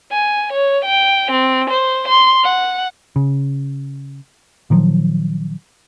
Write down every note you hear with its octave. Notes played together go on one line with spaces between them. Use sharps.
G#5
C#5
G5
C4
C5
C6
F#5
C#3
A#2 D#3 F3 F#3